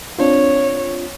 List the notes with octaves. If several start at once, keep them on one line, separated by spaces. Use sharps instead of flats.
C4 D4 F4 C#5